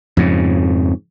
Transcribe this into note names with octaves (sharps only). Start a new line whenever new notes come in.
F2 G#2 C#3